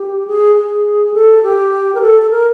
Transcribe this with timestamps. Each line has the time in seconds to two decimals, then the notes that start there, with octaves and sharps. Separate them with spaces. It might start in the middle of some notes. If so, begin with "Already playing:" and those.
Already playing: G4
0.27 G#4
0.56 G#4
1.14 A4
1.43 G4
1.95 A#4
2.01 A4
2.22 A4
2.30 A#4